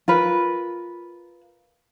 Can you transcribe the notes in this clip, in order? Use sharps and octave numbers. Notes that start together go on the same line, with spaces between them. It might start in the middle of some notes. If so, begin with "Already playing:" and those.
F4 A#4 B4